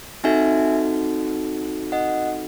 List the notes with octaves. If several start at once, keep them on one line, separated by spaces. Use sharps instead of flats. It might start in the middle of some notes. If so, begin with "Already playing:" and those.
C4 D#4 F#4 A4 E5 G#5
D#5 F#5